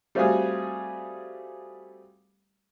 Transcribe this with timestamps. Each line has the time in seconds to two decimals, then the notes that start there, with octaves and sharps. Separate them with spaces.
0.15 G3 A3 C4 F4 F#4 G#4